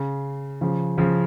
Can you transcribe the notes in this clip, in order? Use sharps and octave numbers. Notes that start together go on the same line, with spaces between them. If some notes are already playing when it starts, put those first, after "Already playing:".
Already playing: C#3
C#3 F3
C#3 F3